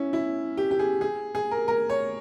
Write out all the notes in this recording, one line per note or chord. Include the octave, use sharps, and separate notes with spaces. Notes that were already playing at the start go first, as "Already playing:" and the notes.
Already playing: C#4 E4
E4
G4
G4
G#4
G#4
G#4
A#4
A#4
C#5